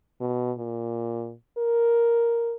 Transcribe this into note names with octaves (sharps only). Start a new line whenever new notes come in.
B2
A#2
A#4